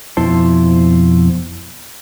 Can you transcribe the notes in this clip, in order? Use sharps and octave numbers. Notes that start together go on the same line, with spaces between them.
F2 B2 E4 C5 A5